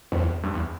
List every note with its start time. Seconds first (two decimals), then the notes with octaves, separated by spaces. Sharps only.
0.12 F2
0.19 E2
0.43 G2
0.54 E2